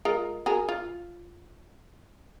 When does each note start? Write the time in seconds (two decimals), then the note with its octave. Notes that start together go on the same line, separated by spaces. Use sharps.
0.05 G#3 F4 A#4
0.46 F#4 G#4 A#4
0.69 F4